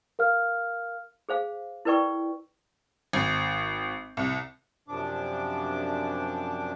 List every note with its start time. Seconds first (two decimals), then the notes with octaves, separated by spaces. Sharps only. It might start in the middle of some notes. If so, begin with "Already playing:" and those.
0.19 A#4 F5 F6
1.29 G#4 C5 F5
1.85 E4 A#4 B4 D5 G5 C#6
3.13 G#1
4.17 C2
4.88 F#2 C3 F3 D4 D6